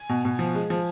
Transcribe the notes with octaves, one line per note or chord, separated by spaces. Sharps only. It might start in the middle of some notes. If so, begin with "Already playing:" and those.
Already playing: G#5
B2
B2
F3
G#3
F3